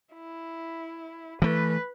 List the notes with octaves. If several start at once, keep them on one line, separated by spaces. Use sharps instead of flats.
E4
E3 A3 B4